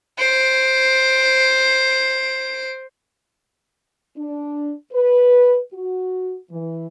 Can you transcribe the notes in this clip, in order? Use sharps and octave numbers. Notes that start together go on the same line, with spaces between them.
C5 D7
D4
B4
F#4
E3